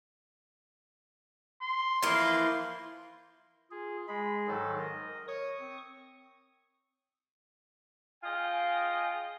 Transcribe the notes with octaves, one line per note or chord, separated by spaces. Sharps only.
C6
E3 F3 A#3
F4 G#4
G#3 G#4 B5
G#2 D#3 F#3 A4
A#4 D#5
C#5 C#6 D#6
C4
F4 G#4 D#5 F5 G5 G#5